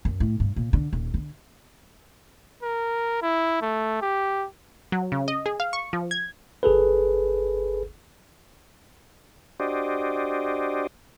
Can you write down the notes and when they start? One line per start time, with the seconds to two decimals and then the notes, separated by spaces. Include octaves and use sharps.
0.05 F#2
0.20 A2
0.40 G2
0.56 A#2
0.73 D3
0.93 D#1
1.14 D3
2.63 A#4
3.22 E4
3.62 A3
4.02 G4
4.92 F#3
5.12 C#3
5.28 D#5
5.46 G#4
5.60 F5
5.73 C#6
5.93 F3
6.11 G#6
6.63 G1 G#4 A4 B4
9.60 D4 F#4 G4 C5 D5 D#5